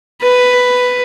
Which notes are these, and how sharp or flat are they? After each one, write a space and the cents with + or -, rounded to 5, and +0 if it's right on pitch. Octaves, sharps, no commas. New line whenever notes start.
B4 +5